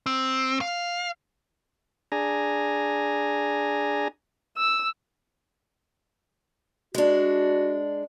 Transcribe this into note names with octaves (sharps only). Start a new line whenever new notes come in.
C4
F5
D4 G#4 G#5 A#5
E6
G#3 D4 F#4